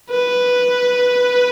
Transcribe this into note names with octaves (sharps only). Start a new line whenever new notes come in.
B4